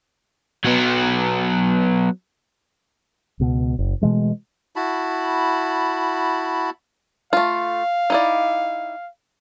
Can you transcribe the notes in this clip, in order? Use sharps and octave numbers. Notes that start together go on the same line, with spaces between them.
F#3 B3
C#2 B2
F#1
B2 E3 G#3 A3
E4 F#4 A5 B5
A3 F4 F5
D#4 E4 D5